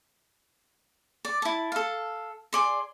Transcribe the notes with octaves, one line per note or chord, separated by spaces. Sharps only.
D5
E4 A5
A4 F5
G#4 D5 C6